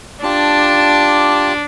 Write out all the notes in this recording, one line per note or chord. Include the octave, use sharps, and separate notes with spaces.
D4 F4 G4 A5